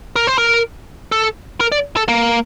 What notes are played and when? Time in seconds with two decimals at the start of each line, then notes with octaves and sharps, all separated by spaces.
0.16 A#4
0.27 C5
0.38 A#4
1.12 A4
1.61 A#4
1.72 D5
1.97 A4
2.09 A#3